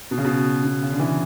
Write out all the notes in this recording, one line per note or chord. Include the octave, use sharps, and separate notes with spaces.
B2
C#3
B2
B2
C#3
D3
E3